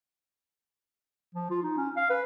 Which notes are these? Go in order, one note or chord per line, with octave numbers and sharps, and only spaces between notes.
F3
F4
D#4
C#4
F5
B4